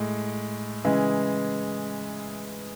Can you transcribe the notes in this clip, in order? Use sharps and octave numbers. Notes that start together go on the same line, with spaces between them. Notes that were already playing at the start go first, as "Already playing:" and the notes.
Already playing: A2 G#3
C#3 E3 G#3